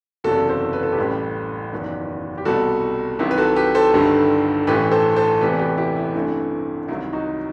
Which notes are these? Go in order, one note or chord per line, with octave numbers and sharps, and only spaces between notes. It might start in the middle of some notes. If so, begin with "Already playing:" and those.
F#1 E2 C3 F#3 F#4 A4
A4 C5
B4
A4
G4 B4
A1 A2 G3
F#1 E2 D#3 F#3
G4
C2 B2 G3 F#4 A4
C2 C3 D#3 F#3 E4 G4
B4
F#4 A4
G4 B4
A4 C5
G1 G2 D#3 G3
A1 A2 E3 A3 G4 B4
A4 C5
A4 C5
E1 E2 C3 E3 A3 G4 B4
G4 B4
E4 G4
E4
A1 G2 E3 A3 C4
C2 C3 D#3 F#3 E4
D#4 F#4